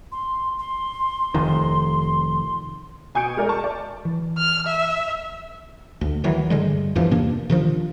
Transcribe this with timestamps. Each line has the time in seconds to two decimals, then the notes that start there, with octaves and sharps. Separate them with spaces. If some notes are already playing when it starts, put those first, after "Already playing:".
0.12 C6
0.59 C6
1.34 F1 D#3
3.15 B2 G#5 D#6 G6 C#7 D7
3.37 G#3 A#4 D5
3.49 A5 C#6
3.64 D5
4.05 E3
4.38 F6
4.67 E5
6.01 D2
6.24 D#3 E3 F#3
6.50 G2 D3 G3 G#3
6.96 E2 G2 E3 F3
7.11 C3 A#3 D4
7.50 C3 D#3 F3 D4